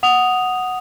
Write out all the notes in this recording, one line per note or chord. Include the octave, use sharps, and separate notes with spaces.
F#5 D#6 F7